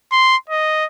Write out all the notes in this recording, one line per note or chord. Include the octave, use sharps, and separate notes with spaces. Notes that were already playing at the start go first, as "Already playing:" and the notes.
C6
D#5